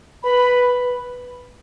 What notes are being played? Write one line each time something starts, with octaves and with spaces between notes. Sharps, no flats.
B4 B5